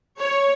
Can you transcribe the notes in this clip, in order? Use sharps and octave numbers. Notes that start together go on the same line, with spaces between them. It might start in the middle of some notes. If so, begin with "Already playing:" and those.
C#5